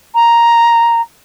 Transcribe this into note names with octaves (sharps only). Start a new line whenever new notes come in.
A#5